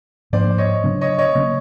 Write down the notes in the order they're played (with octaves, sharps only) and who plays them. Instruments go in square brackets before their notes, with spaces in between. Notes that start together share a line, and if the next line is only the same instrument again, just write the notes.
[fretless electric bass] G#2 F3 A#3 D4 [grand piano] C5 D5
[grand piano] C#5 D#5
[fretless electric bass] C#3 F#3 B3 D4
[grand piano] C#5 D#5
C#5 D#5
[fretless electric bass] C#3 F#3 A#3 C#4